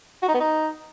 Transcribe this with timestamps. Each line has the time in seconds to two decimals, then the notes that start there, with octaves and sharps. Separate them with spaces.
0.22 F#4
0.28 D#4
0.34 B3
0.40 D#4